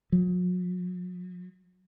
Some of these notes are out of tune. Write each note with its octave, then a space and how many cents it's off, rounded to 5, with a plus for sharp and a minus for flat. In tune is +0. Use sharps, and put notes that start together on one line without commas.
F#3 -45